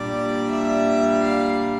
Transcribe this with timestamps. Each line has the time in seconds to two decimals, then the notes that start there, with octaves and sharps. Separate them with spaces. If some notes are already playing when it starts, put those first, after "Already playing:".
Already playing: A#2 G3 D4 D5
0.53 E5
1.25 F5